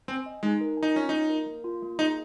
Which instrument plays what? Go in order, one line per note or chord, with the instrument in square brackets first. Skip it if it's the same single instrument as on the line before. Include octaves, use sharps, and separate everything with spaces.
[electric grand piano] C4 [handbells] G#5
[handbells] D#5
[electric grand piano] G#3 [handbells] D#4
[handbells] A#4
G#5
[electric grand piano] D#4
[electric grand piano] C#4 [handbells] F4
[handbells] A#3 [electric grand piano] D#4
[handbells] A#4
A#3
F4
A#3
[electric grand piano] D#4 [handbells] G#4